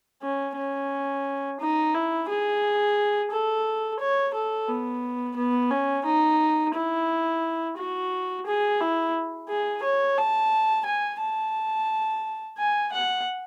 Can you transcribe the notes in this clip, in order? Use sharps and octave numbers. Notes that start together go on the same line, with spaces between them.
C#4
C#4
D#4
E4
G#4
A4
C#5
A4
B3
B3
C#4
D#4
E4
F#4
G#4
E4
G#4
C#5
A5
G#5
A5
G#5
F#5